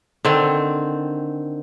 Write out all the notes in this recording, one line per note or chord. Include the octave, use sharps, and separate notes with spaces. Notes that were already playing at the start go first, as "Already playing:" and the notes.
D3 D#3 C4